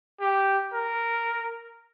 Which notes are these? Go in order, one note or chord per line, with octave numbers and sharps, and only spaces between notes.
G4
A#4